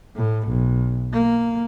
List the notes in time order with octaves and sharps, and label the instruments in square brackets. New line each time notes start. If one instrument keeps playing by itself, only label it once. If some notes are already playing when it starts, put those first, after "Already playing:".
[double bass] A2
B1
A#3